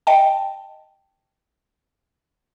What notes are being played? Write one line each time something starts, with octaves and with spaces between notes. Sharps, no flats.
D#5 G5 A5